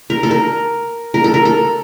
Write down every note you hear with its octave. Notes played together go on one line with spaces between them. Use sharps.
A#4
A4
A#4
A#4
A4
A#4
A4